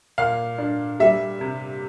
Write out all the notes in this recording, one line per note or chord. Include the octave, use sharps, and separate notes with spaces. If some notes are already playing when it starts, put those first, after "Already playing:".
A#2 F5
D4
G3 E5
C3